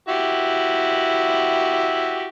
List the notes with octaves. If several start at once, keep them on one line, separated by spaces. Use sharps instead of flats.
E4 F#4 G4